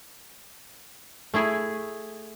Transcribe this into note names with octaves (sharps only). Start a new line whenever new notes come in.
A3 E4 G#4